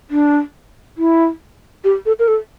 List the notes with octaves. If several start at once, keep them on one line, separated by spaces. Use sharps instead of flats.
D4
E4
G4
A4
A#4
A4